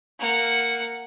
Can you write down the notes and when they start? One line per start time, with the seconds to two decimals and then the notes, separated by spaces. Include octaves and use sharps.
0.20 A#3 F#5